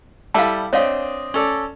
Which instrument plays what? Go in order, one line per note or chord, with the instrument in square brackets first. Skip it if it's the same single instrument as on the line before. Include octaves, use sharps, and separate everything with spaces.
[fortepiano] G3 E4 A4 [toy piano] F5 A5
[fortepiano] C4 D4 D#5 [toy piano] C#5 F5
[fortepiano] C#4 A4 D5